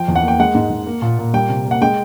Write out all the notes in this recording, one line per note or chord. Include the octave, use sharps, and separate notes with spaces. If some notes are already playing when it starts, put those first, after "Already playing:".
Already playing: F3 G5
E2
F#5
A#3 G5
G#3 F#5
G#2
G#2
A#3
A#2
A#2
G3 G5
C3
A#3
F#5
G#3 G5